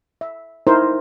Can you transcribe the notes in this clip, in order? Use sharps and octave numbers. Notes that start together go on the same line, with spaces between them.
E5
D#4 E4 A#4 C5